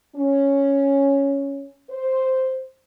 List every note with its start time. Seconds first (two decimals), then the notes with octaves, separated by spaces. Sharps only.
0.16 C#4
1.90 C5